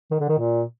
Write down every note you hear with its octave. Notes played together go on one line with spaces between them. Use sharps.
D#3
D3
D#3
A#2